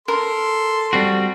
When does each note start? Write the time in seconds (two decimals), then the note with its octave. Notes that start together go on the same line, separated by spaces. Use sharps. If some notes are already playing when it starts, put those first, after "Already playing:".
0.08 A4 A#4 C6
0.93 G3 C4 F#4